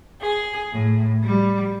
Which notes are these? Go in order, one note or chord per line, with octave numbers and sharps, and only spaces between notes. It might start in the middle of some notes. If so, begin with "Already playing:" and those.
G#4
A2
G3